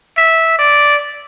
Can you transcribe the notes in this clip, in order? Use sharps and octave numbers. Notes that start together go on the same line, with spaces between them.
E5
D5